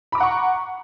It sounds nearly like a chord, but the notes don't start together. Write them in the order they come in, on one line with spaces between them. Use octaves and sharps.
B5 D6 A#5 F#5 C#6